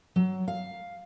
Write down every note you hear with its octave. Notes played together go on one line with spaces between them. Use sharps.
F#3
F5